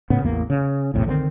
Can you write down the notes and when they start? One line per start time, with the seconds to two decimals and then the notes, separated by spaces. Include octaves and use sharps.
0.10 A2 C#3 B3
0.22 A1 E2 A#3
0.50 C#3
0.94 B1 E2 A2 C3
1.06 D3 D#3 G3 C4